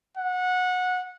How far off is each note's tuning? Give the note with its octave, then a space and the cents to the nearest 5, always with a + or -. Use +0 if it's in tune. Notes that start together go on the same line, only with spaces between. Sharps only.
F#5 -20